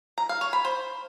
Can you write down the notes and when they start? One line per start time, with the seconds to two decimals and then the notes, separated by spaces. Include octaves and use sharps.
0.18 A#5
0.29 F5
0.41 C#5
0.53 B5
0.65 C5